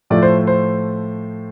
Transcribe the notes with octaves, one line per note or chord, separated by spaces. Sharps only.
A2 F3 A3 D5
C5
C5